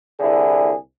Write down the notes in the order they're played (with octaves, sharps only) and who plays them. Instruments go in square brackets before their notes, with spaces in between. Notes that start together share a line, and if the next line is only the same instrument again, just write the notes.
[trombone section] C2 D3 E4 G#4